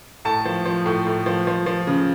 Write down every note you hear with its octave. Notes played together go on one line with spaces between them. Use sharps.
A2 A5
F3
F3
A2
A2
F3
F3
F3
C#3